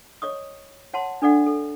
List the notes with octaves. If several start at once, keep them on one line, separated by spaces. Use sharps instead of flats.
C#5 D#5 C#6 D#6
C#5 F#5 A5 A#5 C6
D4 A4 D5 F#5
A4